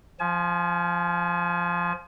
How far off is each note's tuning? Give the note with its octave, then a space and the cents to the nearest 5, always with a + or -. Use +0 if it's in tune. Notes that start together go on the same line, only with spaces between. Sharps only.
F3 +0 G#5 +35